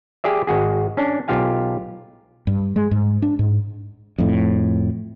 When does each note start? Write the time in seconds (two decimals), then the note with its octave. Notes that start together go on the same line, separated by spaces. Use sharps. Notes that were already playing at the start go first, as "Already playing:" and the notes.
0.24 G4 G#4 D5 E5
0.47 G#1 G#3 F#4 G#4
0.97 C#4 D4
1.28 B1 F4 G4 F5 G#5
2.47 G2
2.76 G#3
2.91 G#2
3.22 D4
3.39 G#2
4.18 F2 A2